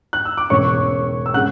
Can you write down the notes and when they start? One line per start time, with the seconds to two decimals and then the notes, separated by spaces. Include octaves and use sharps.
0.13 F#6
0.25 E6
0.38 D6
0.50 E1 E2 C#3 C#5 C#6
1.26 E6
1.34 C#3 G#3 F#5 F#6